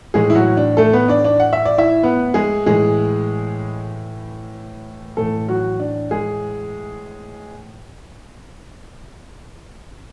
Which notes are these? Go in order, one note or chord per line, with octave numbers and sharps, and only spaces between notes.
A2 E3 G#3 G#4
E4
F#3 F#4
D4
A3 A4
B3 B4
D4 D5
D4 D5
F#5
E5
D5
E4 E5
B3 B4
G#3 G#4
A2 E3 G#3 G#4
A2 E3 A3 A4
F#3 F#4
D4
G#3 G#4